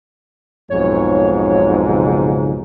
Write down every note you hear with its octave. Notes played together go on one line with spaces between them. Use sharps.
B1 F2 G#2 C#5
C#3